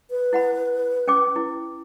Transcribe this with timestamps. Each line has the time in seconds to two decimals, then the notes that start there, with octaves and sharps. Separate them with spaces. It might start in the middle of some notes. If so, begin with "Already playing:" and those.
0.10 B4
0.33 E4 F#5 B5
1.07 C#4 G5 D6
1.36 E4